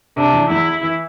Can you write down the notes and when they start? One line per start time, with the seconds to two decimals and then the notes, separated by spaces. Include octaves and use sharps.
0.17 C3 D4
0.33 E2
0.50 E2 E4
0.83 E3